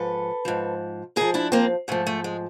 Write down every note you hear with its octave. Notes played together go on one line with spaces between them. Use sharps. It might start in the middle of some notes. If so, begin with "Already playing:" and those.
Already playing: G#2 F3 A4 B4
G#2 F3
G#2 F3 G#4 A#4
D4 E4
A#3 C4
G#2 F3 A3
A3
G#3